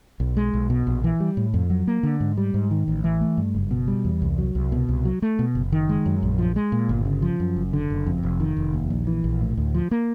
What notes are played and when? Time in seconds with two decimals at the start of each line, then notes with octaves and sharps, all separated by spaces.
0.20 B1
0.37 G#3
0.54 B1
0.70 B2
0.87 A#1
1.04 E3
1.20 G3
1.37 A2
1.54 F2
1.70 F#3
1.87 A#3
2.03 D3
2.20 G#2
2.37 G3
2.54 G#2
2.71 D#3
2.88 A1
3.04 E3
3.21 A3
3.38 G2
3.55 F#1
3.71 B2
3.88 G3
4.05 E2
4.22 C2
4.38 F#3
4.55 C2
4.72 B2
4.89 C2
5.05 F#3
5.22 A3
5.39 B2
5.55 F#1
5.72 D#3
5.89 G#3
6.06 F#2
6.23 A#1
6.39 F3
6.56 G#3
6.72 A#2
6.89 G1
7.06 C#3
7.22 F3
7.40 F#2
7.56 F#1
7.73 D3
7.90 F#1
8.07 F2
8.23 F1
8.40 D#3
8.57 F1
8.74 D#2
8.90 A#1
9.07 E3
9.24 A#1
9.41 A2
9.57 D2
9.74 F3
9.91 A#3